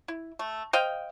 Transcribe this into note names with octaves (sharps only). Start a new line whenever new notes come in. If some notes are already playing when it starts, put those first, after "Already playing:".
E4
A3
C5 D#5 F5 G5